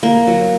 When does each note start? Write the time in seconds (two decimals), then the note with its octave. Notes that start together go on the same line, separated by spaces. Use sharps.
0.03 A#3
0.27 F#3